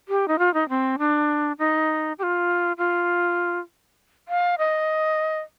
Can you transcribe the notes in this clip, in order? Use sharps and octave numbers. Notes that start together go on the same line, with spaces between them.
G4
D#4
F4
D#4
C4
D4
D#4
G4
F4
F4
F5
D#5